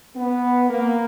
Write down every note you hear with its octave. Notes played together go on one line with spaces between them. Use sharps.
B3
A#3